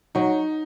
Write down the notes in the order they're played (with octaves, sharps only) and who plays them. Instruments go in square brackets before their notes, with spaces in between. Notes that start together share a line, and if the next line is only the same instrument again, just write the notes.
[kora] F#3 [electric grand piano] D#4